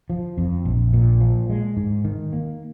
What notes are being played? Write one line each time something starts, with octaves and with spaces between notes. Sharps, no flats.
F3
F2
A#1
A#2
F3
G#3
G#2
D#3
A#3